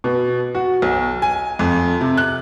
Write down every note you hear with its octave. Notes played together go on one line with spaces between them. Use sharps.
B2
F#4
B1
G#5
F2
C3
F#6